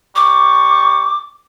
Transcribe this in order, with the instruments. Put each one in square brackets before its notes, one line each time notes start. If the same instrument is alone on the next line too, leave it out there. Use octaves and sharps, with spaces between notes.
[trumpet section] G3 C#6 [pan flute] D6